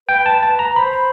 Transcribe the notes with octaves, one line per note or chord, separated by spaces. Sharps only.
B4 G5
A5
B4
A5
B4
A#5
C5 B5